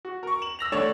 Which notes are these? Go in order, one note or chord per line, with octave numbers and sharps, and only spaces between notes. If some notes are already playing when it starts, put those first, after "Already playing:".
F#4
A#4 C#6
E7 F#7
E6 A#6 F7
A2 D3 A4 C#5 D5 E7